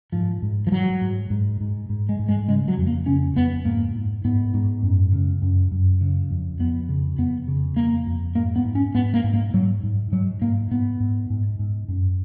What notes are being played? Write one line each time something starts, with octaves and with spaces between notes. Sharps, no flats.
G#2 F3
G#2
F3
G#2 F#3
G#2
G#2
G#2
G#2
G#3
G#2
G#3
C#3 G#3
F#3
F2
A#3
C#3 C#4
F2 B3
G#2 A#3
G#2
G#2 B3
G#2
F#2
C#3
F#2
F#2
C#3
F2
F2 B3
C#3
F2 B3
C#3
F2 A#3
F2
G#2 A#3
B3
G#2
C#4
G#2 B3
A#3
G#2
A#3
G#2 F#3
G#2
G#2 F#3
G#2 A#3
G#2 B3
G#2
G#2
G#2
F#2